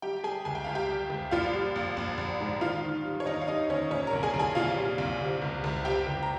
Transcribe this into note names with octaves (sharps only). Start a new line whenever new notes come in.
G3 G4 G5
G3 G#4 G#5
C#2 G#5
G5
C#2 F5
G4 G5
G3
C#2
A#1 F4 F5
G3
A#1
A#1
A#1
G#2
D#3 F4 F5
D#3
G3
C#5
D#2 D#4 D#5
F5
G3 D#4 D#5
D#2 C#4 C#5
A#2 C#4 C#5
A#4 A#5
C2
G#4 G#5
C2
G#4 G#5
A#2 F4 F5
G3
C2
C3
C#2
C#2
C3 G4 G5
C#2
A#5